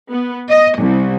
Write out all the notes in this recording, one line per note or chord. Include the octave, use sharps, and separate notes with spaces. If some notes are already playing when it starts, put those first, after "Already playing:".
B3
D#5
C2